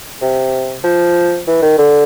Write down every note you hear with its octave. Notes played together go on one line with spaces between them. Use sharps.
C3
F3
E3
D#3
D3